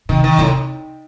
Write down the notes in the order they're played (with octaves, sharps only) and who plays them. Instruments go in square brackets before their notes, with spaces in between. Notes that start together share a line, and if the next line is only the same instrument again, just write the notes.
[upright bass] C3 [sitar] D#3
[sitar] D#3
[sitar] A2 [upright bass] C3